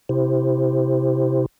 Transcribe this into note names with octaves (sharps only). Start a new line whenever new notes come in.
C3 E4 G4 C5